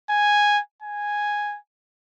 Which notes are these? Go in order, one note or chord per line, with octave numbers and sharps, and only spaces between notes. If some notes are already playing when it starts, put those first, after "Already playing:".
G#5
G#5